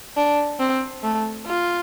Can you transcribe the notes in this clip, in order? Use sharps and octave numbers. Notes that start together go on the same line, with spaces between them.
D4
C4
A3
F4